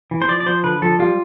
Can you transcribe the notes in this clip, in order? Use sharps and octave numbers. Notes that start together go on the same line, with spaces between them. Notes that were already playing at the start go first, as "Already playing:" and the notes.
E3
C5
F3 D5
D5
F3 C5
D3 B4
F3 A4
G3 F4